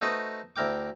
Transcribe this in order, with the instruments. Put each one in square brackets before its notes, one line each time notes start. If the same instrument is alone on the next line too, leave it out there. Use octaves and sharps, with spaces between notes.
[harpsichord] A3 D#4 F#4 B4 C5 D#5
D2 E4 A#4 G5 D6